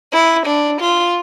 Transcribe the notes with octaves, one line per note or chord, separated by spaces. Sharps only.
E4
D4
F4